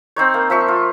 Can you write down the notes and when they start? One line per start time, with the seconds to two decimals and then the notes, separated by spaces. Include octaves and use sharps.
0.16 C4 D#4 C#5
0.34 A#3
0.50 F3 E5 C#6
0.68 F4